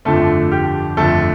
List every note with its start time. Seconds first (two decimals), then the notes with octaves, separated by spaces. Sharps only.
0.05 G1 F2 D3 F3 A3 A4
0.52 G4
0.97 G1 F2 D3 F3 A3 A4